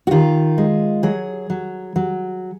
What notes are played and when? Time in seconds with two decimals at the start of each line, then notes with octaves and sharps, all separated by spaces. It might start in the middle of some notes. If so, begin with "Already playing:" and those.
0.07 F#4
0.11 D#3 F4
0.58 G#3
1.03 F#3 G#4
1.50 F#3
1.96 F#3